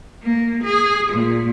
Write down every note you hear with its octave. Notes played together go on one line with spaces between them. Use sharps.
A#3
G#4
A#2